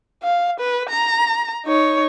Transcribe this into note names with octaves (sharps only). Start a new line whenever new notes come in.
F5
B4
A#5
D#4 C#5